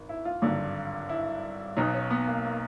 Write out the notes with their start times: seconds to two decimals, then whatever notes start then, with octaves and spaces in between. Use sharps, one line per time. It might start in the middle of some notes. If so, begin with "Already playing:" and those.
Already playing: G#1
0.09 E4
0.25 F4
0.42 G#1 G2 D3 F#3
1.09 E4
1.77 B1 B2 F#3 D#4
1.94 C#4
2.10 B3
2.27 A#3
2.45 A#3